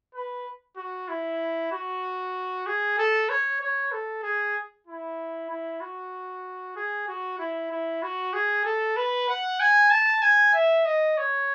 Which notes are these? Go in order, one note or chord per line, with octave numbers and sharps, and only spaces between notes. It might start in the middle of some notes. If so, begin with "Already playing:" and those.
B4
F#4
E4
F#4
G#4
A4
C#5
C#5
A4
G#4
E4
E4
F#4
G#4
F#4
E4
E4
F#4
G#4
A4
B4
F#5
G#5
A5
G#5
E5
D#5
C#5